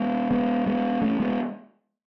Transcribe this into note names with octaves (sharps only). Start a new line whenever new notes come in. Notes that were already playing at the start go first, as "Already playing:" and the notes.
Already playing: G#3 B3
G#3 B3
G#3 B3
A3 C#4
G#3 B3